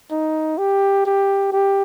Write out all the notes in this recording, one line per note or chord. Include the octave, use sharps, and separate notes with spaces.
D#4
G4
G4
G4